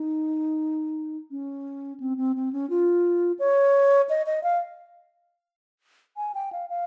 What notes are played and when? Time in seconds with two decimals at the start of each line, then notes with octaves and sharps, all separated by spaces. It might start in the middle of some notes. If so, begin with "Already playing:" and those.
Already playing: D#4
1.31 C#4
2.00 C4
2.18 C4
2.36 C4
2.53 C#4
2.70 F4
3.39 C#5
4.09 D#5
4.26 D#5
4.43 F5
6.17 G#5
6.35 G5
6.52 F5
6.70 F5